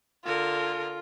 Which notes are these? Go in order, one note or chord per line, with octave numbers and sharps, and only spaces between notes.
D3 F4 A#4